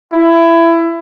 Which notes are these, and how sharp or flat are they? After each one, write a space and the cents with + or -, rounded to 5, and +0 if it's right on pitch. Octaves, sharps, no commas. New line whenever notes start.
E4 +20